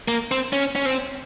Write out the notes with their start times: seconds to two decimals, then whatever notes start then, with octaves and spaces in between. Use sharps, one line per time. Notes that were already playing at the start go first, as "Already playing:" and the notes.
0.08 A#3
0.31 C4
0.53 C#4
0.75 C#4
0.86 C4